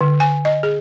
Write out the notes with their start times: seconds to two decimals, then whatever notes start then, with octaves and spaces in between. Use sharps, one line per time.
0.01 D3
0.20 G#5
0.45 D#5
0.63 G#4